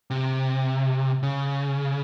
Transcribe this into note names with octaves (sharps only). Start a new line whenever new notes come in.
C3
C#3